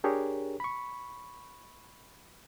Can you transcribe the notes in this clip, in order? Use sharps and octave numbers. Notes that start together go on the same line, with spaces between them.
D4 G4 G#4 A#4 C#5
B5 C#6